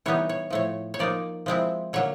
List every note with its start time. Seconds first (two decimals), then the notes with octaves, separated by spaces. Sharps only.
0.06 E3 G3 B3 D#4 C#5
0.29 C#5
0.50 A2 F3 A3 C#5
0.94 C#5
0.99 F3 A#3 D#4 D5
1.46 F3 G#3 C4 E4
1.93 D3 F#3 A#3 C#5